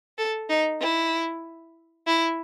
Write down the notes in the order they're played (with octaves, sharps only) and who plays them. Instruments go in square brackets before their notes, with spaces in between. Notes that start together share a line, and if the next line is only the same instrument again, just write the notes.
[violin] A4
D#4
E4
E4